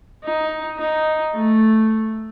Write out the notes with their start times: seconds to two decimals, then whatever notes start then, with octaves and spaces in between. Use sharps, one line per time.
0.24 D#4
0.79 D#4
1.35 A3